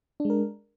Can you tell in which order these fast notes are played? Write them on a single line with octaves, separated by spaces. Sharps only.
D4 G#3 A#4